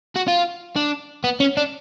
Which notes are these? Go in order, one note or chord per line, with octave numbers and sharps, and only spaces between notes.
F#4
F4
D4
B3
C#4
D4